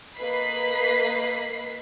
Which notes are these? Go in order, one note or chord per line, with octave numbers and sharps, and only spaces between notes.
A#3 B4 D#5 B5 B6 C7